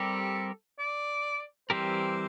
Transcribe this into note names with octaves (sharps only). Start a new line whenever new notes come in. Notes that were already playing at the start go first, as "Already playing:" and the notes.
Already playing: G3 C4 G4 A4 A#4
D5
E3 G3 C4 G4 A#4 C5